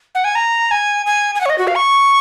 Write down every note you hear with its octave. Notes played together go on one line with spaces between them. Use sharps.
F#5
G#5
A#5
G#5
G#5
G#5
F#5
C#5
D#5
F#4
F5
C#6